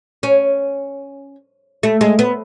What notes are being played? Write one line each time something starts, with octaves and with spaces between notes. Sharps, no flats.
C#4
A3
G#3
B3